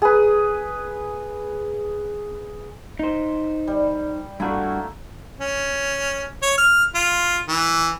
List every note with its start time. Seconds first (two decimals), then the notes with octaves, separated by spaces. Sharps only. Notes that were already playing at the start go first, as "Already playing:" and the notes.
0.02 G#4 B4
2.99 D#4 C5
3.68 G3
4.40 G2 A3 A#3 E4 F#4
5.40 C#4
6.43 C#5
6.58 F6
6.95 F4
7.48 E3